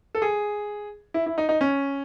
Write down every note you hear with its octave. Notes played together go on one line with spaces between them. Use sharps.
A4
G#4
E4
E4
D#4
D#4
C#4